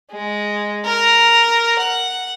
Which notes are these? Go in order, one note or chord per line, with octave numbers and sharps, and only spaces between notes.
G#3
A#4
F#5